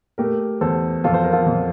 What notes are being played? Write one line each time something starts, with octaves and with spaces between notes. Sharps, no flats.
A3 G4 A#4
E2 A4 C5
F2 F4 A4
C5
A#4
F4 A4
F2